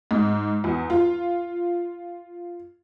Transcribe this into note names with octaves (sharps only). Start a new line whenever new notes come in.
G#2
E2
F4